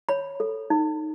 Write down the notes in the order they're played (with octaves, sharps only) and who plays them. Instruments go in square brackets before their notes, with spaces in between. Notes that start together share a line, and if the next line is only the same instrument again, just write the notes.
[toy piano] C#5 B5
A4
D#4